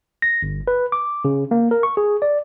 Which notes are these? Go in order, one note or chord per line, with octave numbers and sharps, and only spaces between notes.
A#6
G1
B4
D6
C#3
A#3
A#4
C#6
G#4
D5